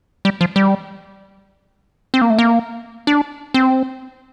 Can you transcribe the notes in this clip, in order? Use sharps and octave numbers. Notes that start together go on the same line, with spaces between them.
G3
F3
G3
C4
A#3
A3
A#3
D4
C4